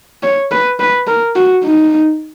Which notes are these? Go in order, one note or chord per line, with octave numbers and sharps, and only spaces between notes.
C#5
B4
B4
A#4
F#4
D#4